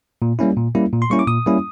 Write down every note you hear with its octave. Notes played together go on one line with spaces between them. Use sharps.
A#2
G3 A#3 C#4 E4
A#2
G3 A#3 C#4 E4
A#2
C6
G3 A#3 C#4 E4 C#6
D6
A#2 D#6
G3 A#3 C#4 E4